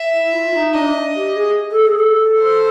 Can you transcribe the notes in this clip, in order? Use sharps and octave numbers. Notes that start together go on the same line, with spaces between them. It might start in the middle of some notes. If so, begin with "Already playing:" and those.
Already playing: E5
E4
F4
D#4
D4 D#5
G4
G#4
A4
G#4
A4
C5